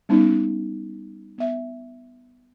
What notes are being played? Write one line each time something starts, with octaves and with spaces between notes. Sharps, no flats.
G3 B3 C#4 D#4
B3 E5